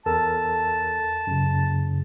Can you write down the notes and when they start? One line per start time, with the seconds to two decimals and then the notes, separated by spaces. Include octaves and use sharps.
0.06 E2 A4 A#4 A5
1.27 F#2 C#3